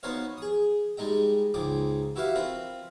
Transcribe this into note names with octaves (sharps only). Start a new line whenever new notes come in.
B3 D#4 F#4 C5 C#5 F5
G#4 D#6
G3 G#3 D#4 D#5 G5
C#2 G#2 G5 D6 D#6
E4 F#4 G4 B4 E5 F5
C4 F4 A#4 B5